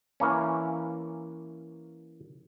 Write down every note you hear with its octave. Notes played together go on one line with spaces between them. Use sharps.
E3 A#3 C#4